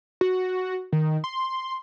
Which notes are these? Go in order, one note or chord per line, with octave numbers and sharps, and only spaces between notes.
F#4
D#3
C6